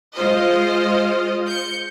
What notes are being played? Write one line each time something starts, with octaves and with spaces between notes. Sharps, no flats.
G#3 F4 C5 D#5
G6 C#7